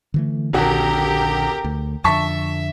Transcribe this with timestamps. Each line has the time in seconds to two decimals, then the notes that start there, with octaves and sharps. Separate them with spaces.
0.14 D3 E3 A3
0.53 D#1 A#1 D3 F#4 G4 A#4
1.64 D2
2.04 F2 D3 E5 A5 C#6 B6